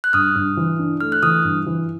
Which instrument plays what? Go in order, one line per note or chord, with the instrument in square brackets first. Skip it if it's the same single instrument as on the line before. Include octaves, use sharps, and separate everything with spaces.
[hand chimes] F#6
[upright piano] G2 [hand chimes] D#6 F6
[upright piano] G2
E3
D4
[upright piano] A3 [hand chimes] F6
[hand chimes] F#6
[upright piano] E3 [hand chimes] D#6 F6
[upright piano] G2
E3